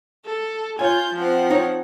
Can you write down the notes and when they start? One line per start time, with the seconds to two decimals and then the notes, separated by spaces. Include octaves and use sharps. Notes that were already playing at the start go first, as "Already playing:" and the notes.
0.24 A4
0.79 F4 C#5 G#5 G6
1.15 F3 C4 F#5
1.50 D#4 C#5